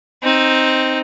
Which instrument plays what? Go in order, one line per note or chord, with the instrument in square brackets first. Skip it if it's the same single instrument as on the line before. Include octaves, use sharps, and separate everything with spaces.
[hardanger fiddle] C4 D#4